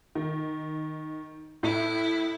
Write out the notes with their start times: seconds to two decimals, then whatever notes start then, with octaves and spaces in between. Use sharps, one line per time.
0.15 D#3
1.63 A2 E4